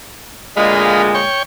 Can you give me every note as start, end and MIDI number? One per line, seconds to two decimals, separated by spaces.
0.57 1.22 38
0.57 1.22 46
0.57 1.22 56
0.57 1.02 75
0.57 1.02 77
0.57 1.02 83
1.15 1.43 73
1.15 1.43 79
1.15 1.43 85